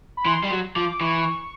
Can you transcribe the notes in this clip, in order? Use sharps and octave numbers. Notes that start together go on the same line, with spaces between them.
B5
E3 C6
G3
F#3
F3 D6
E3 C#6